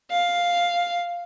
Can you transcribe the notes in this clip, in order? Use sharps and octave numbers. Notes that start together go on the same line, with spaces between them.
F5